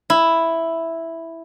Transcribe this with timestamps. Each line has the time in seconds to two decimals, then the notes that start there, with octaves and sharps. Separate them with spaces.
0.10 E4